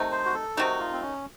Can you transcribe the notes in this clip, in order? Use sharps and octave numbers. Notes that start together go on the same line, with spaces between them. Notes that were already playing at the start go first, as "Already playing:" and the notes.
Already playing: C3 D#3 A3 D#4
C5
F#4
A4
C3 D#3 A3 D#4 F#4
F4
C4
C#4